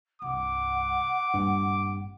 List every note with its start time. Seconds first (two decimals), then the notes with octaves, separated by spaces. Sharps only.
0.22 C2 G2 F#5 D6
1.34 G#1 G2 A#2